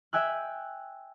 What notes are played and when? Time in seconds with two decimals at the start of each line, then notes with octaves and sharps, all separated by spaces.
0.13 E5 G5 G#5 E6 F#6